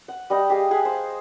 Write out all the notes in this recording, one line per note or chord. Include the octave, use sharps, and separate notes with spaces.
F#5
G3 D#5 G5
G4 G#4 F5
G#4 F#5 G#5 B5
C5 F5